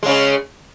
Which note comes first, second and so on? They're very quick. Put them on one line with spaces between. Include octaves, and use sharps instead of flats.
G#3 C#3 C#4